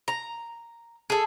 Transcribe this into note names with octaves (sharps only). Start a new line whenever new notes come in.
A#5
G#4 A4